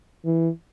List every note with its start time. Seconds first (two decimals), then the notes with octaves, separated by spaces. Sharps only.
0.25 E3